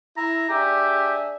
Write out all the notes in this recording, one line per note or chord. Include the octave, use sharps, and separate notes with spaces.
E4 A#5
D4 G4 G#4 E5